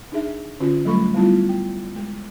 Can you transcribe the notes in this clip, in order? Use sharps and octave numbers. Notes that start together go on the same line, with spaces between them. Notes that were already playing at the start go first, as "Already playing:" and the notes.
D4 D#4 G#4 E5
D3 C#4 F4 F#4
F#3 G3 A3 A4 B5 C#6
G3 B3 E4 F4
G5
G#3